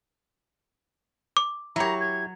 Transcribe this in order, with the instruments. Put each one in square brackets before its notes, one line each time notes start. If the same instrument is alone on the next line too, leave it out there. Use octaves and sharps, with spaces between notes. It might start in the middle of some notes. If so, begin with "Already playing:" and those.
[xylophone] D6
[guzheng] F#3 C#5 [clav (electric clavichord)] E4 G4 [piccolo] A#5
[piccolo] G#6